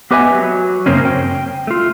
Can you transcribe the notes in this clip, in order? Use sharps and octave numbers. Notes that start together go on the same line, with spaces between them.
B3 G4 B4 D#5 E5 G#5
F#3
F#2 C#3 A#3 C4 C#4
G5
A3 F4